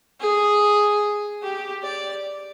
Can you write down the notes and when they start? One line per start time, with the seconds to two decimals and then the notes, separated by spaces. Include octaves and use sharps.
0.20 G#4
1.43 G4
1.83 D5